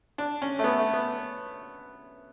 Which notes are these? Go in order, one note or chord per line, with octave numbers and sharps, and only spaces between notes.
D4
C#4
A3
B3
A3
B3